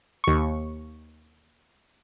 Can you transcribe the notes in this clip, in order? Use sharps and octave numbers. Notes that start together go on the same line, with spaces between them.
D#2 C#6